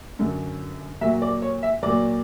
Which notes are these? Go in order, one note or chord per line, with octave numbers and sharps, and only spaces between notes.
F#2 D3 F#3
A#2 F#3 E5
D5
C#5
E5
A#2 F#3 D5